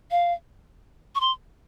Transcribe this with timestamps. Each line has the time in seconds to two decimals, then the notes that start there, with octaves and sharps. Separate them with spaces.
0.11 F5
1.15 C#6
1.21 C6